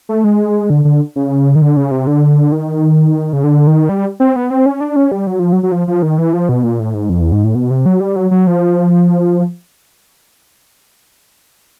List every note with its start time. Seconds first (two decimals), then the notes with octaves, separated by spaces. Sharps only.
0.09 A3
0.24 G#3
0.70 D3
0.85 D3
1.16 C#3
1.55 D#3
1.62 D3
1.77 C#3
1.91 C3
2.07 D3
2.52 D#3
3.33 C#3
3.44 D3
3.67 D#3
3.89 G3
4.20 C4
4.36 B3
4.50 C4
4.66 C#4
4.80 D4
4.96 C#4
5.12 G3
5.27 F#3
5.39 F3
5.53 F#3
5.63 F#3
5.72 F3
5.88 F3
6.02 D#3
6.18 E3
6.33 F3
6.49 B2
6.64 A#2
6.80 A2
6.94 G#2
7.10 F2
7.21 E2
7.32 G#2
7.44 A2
7.55 B2
7.70 C3
7.86 F#3
8.00 G3
8.16 F#3
8.31 F#3
8.47 F3